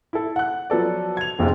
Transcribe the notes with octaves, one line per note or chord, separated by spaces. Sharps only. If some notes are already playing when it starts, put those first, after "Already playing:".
E4 A4
F#5 F#6
F3 F#3 B3 A4 D5
G#6 F7
F1 F2 G#2 C3 G#3 F4